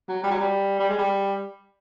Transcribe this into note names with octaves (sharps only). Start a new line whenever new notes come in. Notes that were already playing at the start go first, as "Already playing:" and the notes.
F#3
G3
F#3
G3
G3
G#3
G3